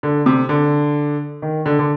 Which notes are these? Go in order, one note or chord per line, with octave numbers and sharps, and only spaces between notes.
D3
C3
D3
D#3
D3
D3